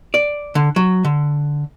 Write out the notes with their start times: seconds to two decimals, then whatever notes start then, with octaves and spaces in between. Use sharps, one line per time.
0.14 D5
0.55 D3
0.76 F#3
1.05 D3